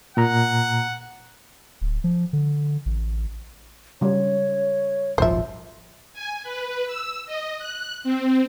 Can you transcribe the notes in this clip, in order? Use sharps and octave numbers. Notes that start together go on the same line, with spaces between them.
A#2 F#5 A#5
D1
F3
D3
A1
C#3 G3 C#5
D#1 G#1 F3 C5 E5
G#5
B4
E6
D#5
F#6
C4